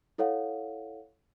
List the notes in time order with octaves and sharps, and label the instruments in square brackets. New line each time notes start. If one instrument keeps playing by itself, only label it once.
[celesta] E4 A4 C#5 F5 F#5